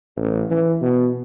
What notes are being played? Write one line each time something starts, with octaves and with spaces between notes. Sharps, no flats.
A1
E3
B2